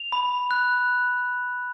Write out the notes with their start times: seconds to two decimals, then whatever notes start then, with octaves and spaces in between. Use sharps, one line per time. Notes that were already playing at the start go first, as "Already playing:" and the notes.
Already playing: F7
0.12 B5
0.51 F#6